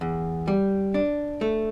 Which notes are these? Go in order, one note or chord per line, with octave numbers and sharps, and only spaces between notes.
E2
G3
D4
A3